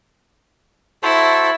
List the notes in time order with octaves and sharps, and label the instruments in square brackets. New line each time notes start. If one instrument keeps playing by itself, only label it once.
[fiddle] E4 [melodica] F#4 A4 C5